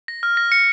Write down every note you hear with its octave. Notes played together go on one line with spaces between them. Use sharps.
A#6
F6
A#6
C#7